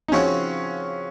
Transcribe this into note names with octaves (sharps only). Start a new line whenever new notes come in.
D#4
C#3 F3 C4 C#4 F#4 C#5